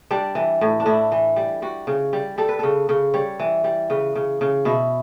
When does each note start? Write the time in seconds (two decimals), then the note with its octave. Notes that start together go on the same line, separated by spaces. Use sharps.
0.11 G3 D4
0.35 E3
0.61 A2
0.80 D4
0.86 A2 E4
1.12 E3
1.36 G3
1.62 G3 F#4
1.87 C#3
2.13 G3
2.38 G3 A4
2.49 B4
2.59 C#3 A4
2.89 C#3
3.14 G3 C#5
3.40 E3
3.64 G3
3.90 C#3 B4
4.15 C#3
4.41 C#3
4.65 B2 E4